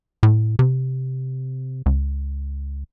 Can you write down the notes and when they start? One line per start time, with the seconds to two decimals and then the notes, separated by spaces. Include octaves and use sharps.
0.23 A2
0.59 C3
1.86 C#2